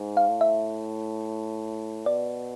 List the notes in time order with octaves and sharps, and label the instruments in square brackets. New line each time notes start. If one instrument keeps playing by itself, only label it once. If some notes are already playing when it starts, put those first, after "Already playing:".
Already playing: [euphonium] G#2
[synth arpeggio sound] F5
[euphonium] A2
[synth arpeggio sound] E5
[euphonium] B2 [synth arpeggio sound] D5